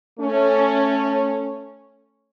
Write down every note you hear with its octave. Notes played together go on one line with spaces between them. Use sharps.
A3 C#4